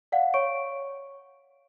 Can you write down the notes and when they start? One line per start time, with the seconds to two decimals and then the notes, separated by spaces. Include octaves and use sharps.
0.12 D5 F5 F#5
0.34 C#5 C#6 D7